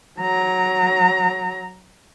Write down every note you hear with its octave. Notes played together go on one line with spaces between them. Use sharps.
F#3 A#5